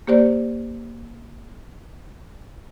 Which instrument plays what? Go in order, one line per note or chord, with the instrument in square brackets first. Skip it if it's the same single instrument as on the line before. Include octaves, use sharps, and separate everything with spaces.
[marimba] A#3 G4 C5 D5